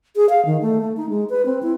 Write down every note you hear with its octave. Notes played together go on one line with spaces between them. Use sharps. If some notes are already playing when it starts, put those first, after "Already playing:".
G#4
F5
D#3
A3
A3
D#4
G#3
B4
C4
E4